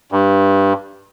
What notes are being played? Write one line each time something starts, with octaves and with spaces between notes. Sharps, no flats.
G2